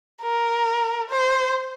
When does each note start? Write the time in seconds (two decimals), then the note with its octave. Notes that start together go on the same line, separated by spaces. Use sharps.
0.23 A#4
1.10 C5